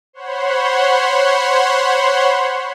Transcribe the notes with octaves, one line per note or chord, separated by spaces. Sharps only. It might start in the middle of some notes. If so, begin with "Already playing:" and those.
C5 C#5 F#5 B5 C6